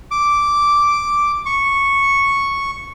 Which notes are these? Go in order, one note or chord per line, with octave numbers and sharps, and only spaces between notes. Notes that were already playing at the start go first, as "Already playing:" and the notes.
D6
C#6